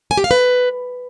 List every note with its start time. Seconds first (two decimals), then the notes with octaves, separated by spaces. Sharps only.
0.11 G#5
0.17 G4
0.24 F5
0.31 B4